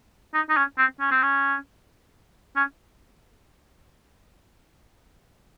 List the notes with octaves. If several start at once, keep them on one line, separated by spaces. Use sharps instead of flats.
D#4
D#4
C#4
C4
C#4
C4
C#4
C#4